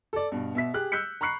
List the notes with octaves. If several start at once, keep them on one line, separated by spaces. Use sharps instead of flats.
A4 D5
G2 B2
B2 E5 B6
G4 G#4 F#6
E6 F#6 G6 B6 C#7
A#5 B5 C#6 F#6 C7 C#7